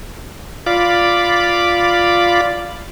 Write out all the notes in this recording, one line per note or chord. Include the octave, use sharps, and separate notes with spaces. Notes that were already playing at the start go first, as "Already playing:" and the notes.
F4 D5 F5 B5 D6